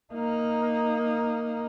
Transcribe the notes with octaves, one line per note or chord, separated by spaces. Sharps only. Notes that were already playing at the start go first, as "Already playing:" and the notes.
A#3 D#4